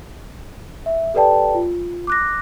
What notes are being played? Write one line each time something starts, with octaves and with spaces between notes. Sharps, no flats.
E5
G4 A4 B4 D5 G5 A5
F4
D6 F#6 A#6